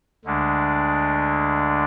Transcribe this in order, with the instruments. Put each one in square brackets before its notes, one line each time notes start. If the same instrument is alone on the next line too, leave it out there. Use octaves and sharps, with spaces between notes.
[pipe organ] D2 D3 G#3 D4